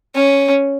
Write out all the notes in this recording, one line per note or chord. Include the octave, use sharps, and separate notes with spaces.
C#4